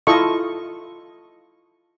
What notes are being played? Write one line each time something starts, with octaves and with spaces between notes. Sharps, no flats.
E4 F4 A4 D#5 C#6